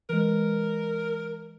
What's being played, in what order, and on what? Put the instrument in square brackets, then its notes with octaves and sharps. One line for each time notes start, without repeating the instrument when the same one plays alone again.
[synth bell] E3 G#3 [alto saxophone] A#4